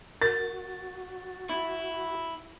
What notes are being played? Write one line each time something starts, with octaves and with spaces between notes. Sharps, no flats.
F#4 A#4 A6
E4